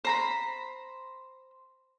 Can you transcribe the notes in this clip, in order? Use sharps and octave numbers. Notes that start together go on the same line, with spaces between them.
C5 A#5 B5